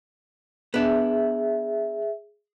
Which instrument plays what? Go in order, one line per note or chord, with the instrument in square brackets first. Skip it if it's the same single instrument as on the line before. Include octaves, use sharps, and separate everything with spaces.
[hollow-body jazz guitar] B3 D4 [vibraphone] G#4 E5